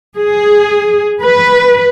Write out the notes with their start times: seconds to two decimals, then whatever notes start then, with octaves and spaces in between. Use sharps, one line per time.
0.17 G#4
1.22 B4